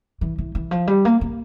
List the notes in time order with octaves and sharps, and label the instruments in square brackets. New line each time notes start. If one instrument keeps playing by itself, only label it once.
[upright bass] E3
E3
E3
F3
G3
A#3
A#3